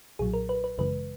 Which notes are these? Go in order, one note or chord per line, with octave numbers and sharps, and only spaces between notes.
B1 A#2 F#3 G#4
A#4
B4
B4
G#1 F#2 C#3 E3 G#3 B4